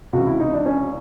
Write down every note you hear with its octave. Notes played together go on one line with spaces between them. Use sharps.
C#2 C3 E3 F#4
E4
D#4
D4
C#4